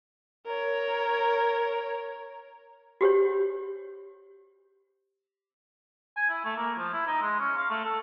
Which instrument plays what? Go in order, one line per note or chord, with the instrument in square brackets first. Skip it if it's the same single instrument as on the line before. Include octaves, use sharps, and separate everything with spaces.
[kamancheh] A#4 C#5
[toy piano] F#4 G4 C5 C#5
[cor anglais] G#5
E4
A3
A#3
F3
E4
D#4
G#3
C#4
F5
A3
A4